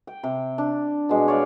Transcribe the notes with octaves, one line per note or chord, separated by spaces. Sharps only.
G5
C3
D4
B2 G#3
C#5 D5 F5